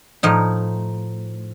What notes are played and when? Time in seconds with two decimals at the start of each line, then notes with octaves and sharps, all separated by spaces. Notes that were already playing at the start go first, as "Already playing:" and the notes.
0.23 A2 F3 D#4